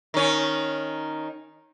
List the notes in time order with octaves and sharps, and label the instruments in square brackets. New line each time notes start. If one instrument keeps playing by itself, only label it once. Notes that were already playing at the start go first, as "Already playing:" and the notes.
[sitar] D#3 C#4